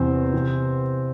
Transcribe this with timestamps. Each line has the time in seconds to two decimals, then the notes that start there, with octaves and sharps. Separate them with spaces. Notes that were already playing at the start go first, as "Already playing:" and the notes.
Already playing: E2 C3 E3 C4 C5
0.33 C3 E3